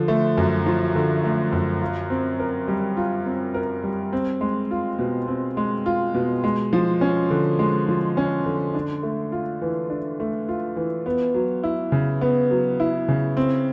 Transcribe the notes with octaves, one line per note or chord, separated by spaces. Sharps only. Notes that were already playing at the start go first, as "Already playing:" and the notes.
Already playing: D3 F3
A3
F#2
F3
D3
A3
F#2
F4
C4
A#4
G3
F4
C4
A#4
G3
C4
G#3
F4
B2
C4
G#3
F4
B2
G#3
F3
C#4
D3
G#3
F3
C#4
D3
D4
A3
F4
E3
D4
A3
F4
E3
B3
F#3
E4
C#3
B3
F#3
E4
C#3
C4